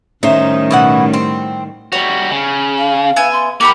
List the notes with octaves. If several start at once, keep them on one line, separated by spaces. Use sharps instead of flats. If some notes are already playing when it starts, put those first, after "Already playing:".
A2 D#3 G3 C#4 D#4 C5 E5
B2 E4 F#5
C4
G3 F#4 C#5
C#3
F5
B3 E5 G#5
C6
A#3 F#4 G4 A#4 B5 D6